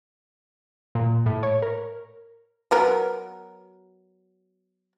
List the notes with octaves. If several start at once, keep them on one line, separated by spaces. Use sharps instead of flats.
A#2
A2
C#5
A#4
F#3 B3 A#4